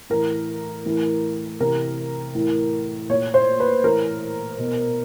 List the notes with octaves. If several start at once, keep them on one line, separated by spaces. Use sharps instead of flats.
A2 E3 A#4
A2 E3
C3 E3 A#4
A2 E3
A#2 C#5
C5
B4
A2 E3 A#4
B2